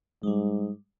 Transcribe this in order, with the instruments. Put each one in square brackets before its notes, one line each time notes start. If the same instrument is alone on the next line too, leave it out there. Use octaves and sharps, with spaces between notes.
[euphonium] G#2 [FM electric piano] G3 G#3